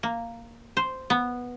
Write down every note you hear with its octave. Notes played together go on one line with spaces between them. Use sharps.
A#3
C5
B3